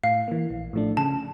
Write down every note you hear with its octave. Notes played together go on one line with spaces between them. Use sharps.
A2 F5
E3 A#3
A#1
A2 F3 A3 D4
C#3 A5